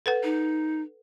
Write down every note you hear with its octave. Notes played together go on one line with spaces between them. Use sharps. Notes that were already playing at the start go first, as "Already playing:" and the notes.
A4 B4 F#5
D#4